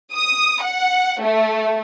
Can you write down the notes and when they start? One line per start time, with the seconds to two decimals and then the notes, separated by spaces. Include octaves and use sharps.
0.14 D#6
0.63 F#5
1.21 A3